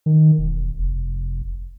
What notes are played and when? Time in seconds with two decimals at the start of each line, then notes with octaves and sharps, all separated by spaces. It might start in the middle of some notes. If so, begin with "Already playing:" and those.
0.06 D#3
0.38 E1
0.78 F1